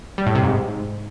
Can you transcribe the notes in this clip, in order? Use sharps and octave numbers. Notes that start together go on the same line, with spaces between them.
G3
A2
C3
G#2